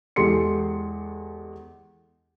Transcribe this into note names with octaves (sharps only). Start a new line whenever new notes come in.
E2 G#3 G4 A4 C6 C#7